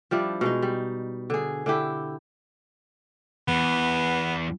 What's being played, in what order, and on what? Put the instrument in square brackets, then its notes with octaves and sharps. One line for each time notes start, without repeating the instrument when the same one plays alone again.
[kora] F3 G3 D4 E4
B2 G#3 D#4
G3
D3 G#4
D3 E4 G4
[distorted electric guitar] E2 [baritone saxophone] B3